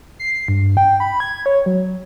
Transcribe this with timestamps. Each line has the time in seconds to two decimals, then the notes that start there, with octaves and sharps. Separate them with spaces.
0.19 C7
0.48 G2
0.77 G5
1.00 B5
1.20 G#6
1.46 C#5
1.66 F#3